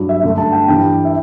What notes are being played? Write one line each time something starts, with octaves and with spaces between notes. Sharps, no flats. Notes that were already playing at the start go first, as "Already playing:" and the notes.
Already playing: G2 F#3
E5
G2 D3 A3
A5
G5
G2 E3 G3 G5
E5